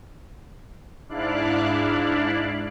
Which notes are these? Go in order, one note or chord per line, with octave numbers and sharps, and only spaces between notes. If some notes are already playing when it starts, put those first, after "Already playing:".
G#2 D4 E4 D5 F5 F#6